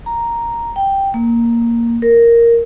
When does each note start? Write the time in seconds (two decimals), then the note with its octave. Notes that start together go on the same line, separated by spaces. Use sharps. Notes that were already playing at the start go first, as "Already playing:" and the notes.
0.06 A#5
0.76 G5
1.14 A#3
2.02 A#4